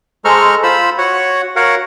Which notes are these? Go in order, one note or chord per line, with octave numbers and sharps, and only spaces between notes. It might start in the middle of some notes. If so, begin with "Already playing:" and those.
G#3 A4 C5 A#5 C#6 F6
F4 C5 B5 E6
F#4 C#5 F#5
F#4 A#4 C#5 F5 F#5